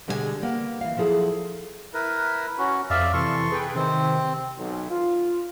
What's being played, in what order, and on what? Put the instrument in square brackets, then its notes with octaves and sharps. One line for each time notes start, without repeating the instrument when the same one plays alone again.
[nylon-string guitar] B2 D3 G3 G#3 C5 G#5
G3 A#3 B3
E3 F5
F3 F#3 E4 G#4 A4
[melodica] E4 A#4 B4
C#4 F#4
[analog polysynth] F2 B5 [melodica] D5 E5 F5
[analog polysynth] C3 E3 [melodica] A4 C6 C#6
[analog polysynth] G#4 B4 G5
[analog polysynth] C3 D#3 [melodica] C4
[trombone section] B1
F4